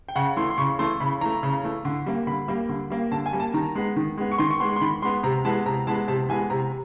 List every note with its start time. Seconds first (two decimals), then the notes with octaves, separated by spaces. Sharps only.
0.09 G5
0.16 C#3 F#5
0.37 E3 A3 C6
0.50 C6
0.58 C#3 C#6
0.79 E3 A3 C6
1.00 C#3 B5
1.21 E3 A3 A#5
1.43 C#3
1.63 E3 A3
1.85 D3
2.06 G3 A#3
2.27 D3 B5
2.48 G3 A#3
2.69 D3
2.90 G3 A#3
3.12 D3 A5
3.26 G#5
3.33 G3 A#3
3.40 A5
3.54 D#3 A#5
3.75 G#3 B3
3.96 D#3
4.18 G#3 B3
4.32 C#6
4.38 D#3 C6
4.50 C#6
4.60 G#3 B3 C6
4.76 C6
4.81 D#3 B5
5.02 G#3 B3 C6
5.23 C3 A#5
5.44 E3 G#3 B3 A5
5.66 C3 A#5
5.87 E3 G#3 B3 A5
6.08 C3 A5
6.29 E3 G#3 B3 G#5
6.50 C3 A#5